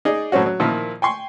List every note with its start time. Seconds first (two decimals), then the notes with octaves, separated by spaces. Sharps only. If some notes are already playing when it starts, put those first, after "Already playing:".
0.05 D#4 G#4 D5
0.32 A2 F#3 C4 C#4 F#4
0.46 F#3
0.60 A#2 D#3 F3 E4
1.02 G5 G#5 C6 C#6